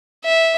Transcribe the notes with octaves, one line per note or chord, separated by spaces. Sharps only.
E5